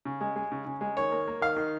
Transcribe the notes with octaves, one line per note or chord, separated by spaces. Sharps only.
C#3
G#3
G#3
C#3
C#3
G#3
D#3 C#5
A#3
A#3
D#3 F5
D#3